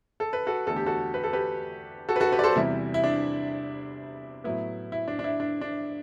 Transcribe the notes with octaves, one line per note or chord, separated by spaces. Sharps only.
A4
B4
F#4 A4
E2 D3 A3 A4
G4
F#4 A4
B4
A4
G4 B4
F#4 A4
B4
F#4 A4
G4 B4
D5
A4 C5
E2 C3 E3 G3 E4
E4
D4
A2 F#3 B3 E4
E4
D4
D4
E4
D4
D4